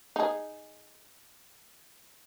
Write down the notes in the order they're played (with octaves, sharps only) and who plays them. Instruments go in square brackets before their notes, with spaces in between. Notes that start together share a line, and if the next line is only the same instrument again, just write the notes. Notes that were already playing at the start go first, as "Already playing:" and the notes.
[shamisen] D#4 G#4